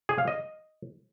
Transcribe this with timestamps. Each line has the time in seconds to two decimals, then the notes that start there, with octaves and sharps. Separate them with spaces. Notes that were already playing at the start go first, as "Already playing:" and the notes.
0.09 G#4
0.18 F5
0.28 D#5